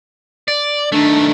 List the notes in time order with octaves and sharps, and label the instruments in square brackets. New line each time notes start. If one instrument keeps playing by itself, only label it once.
[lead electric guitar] D5
[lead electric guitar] D#3 A3 [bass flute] D4